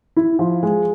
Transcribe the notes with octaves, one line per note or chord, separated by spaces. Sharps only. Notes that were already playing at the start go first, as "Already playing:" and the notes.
E4
F3
G#3